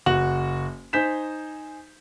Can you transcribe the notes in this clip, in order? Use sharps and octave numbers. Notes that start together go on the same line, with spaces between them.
F#1 F#4 C#6 F#7
D#4 C5 G#5 G6 B6 E7